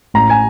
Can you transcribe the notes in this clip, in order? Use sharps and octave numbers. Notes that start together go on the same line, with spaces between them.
A1 A#5
G#5